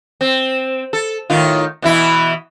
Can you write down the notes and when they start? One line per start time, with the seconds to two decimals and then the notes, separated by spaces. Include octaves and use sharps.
0.21 C4
0.93 A4
1.30 A2 D#3 F4
1.82 B2 E3 E4